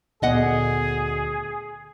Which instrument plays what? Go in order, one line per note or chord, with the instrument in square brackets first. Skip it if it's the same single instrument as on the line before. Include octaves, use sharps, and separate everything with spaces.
[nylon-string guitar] D2 D#5 F#5 [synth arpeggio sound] A#2 B3 D5 [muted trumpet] G#4